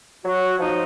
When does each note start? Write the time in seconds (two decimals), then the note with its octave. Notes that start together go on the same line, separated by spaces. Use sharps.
0.24 F#3 F#4
0.60 F3 D#4